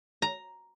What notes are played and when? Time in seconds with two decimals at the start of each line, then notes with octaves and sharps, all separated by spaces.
0.22 A#5